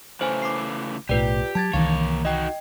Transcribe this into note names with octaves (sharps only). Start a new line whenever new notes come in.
C#3 E3 A3 C5 G#5
D6 C7
B1 A2 F4 G4 B4 D5
F#3 A5 G#6 A6
C2 D#3 E3 A#3 C#5 F5
D#4 F#4 D#5 G5